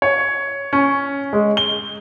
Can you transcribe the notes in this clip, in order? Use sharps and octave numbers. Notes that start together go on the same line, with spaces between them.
C#5
C#4
G#3
G7